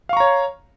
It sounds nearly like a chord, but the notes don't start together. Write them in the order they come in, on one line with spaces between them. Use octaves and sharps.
F5 C#6 A#5 C#5